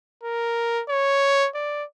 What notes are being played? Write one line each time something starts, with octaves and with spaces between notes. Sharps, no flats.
A#4
C#5
D5